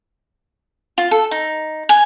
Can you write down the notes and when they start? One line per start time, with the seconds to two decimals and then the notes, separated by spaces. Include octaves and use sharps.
0.98 F4
1.11 A4
1.31 D#4
1.89 G#5